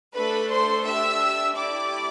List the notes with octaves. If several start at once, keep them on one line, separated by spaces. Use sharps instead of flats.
A3 D4 A4 B4 B5
C5 C6
D4 G4 E5 E6
A3 E4 G4 D5 D6